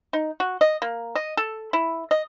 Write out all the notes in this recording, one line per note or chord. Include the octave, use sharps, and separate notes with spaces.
D#4
F#4
D#5
A#3
D#5
A4
E4
D#5